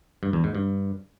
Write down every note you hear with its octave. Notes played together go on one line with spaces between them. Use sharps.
G2
E2
G#2
G2